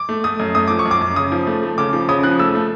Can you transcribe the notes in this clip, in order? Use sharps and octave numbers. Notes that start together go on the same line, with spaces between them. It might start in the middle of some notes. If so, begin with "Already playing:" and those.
Already playing: D6
A3
A3 D#6
F#2
A3 D#6
F3 D6
C#6
F#2
D6
F#2
C#3 D#6
F3
A3
A3
C#3 D6
F3
C#3 D#6
F3 F#6
A3 E6
A3